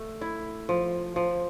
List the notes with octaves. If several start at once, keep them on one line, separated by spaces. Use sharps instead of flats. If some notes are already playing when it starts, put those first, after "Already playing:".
Already playing: A3
E4
F3
F3